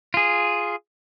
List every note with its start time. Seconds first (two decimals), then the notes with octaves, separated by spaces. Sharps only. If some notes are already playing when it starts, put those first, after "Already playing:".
0.14 F4 G#4